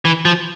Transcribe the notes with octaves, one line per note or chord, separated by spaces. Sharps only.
E3
F3